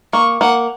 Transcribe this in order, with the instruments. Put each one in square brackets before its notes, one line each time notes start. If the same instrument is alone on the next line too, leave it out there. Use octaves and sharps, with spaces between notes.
[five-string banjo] A#3 [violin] C#6
[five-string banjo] A#3 [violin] F#5